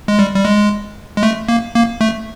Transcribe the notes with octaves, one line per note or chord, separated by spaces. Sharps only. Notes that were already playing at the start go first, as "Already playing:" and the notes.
G#3
G3
G3
G#3
G#3
A3
A#3
A#3
A3